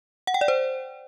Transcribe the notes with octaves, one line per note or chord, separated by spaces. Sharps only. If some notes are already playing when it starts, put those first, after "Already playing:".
F#5
G5
D5
C5